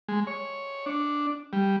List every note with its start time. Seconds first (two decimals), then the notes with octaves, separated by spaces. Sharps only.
0.08 G#3
0.27 C#5
0.86 D4
1.53 G3